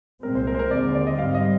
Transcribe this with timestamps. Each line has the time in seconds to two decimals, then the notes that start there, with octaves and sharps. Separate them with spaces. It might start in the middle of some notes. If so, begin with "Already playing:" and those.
0.23 C2 A#2 G#3 C4 A#4
0.35 C5
0.47 A#4
0.54 C5
0.59 A#4
0.71 D#2 D3 G#3 C4 D5
0.95 D5
1.07 D#5
1.19 G#2 G3 C4 F5
1.34 D#5